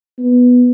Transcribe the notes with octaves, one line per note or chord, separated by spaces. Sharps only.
B3